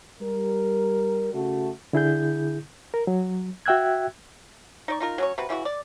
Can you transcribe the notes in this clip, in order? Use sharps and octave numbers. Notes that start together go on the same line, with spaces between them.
G3 A#4
C#3 A3 F#4
D3 E4 G#4 G6
A#4
F#3
F#4 E5 G5 E6 F#6 G#6
D#4 D5 C#6
D#4 F4 A#4
F#3 C#4 C#5
C3 F#4 B4
C#3 E3 F4 F#4
D5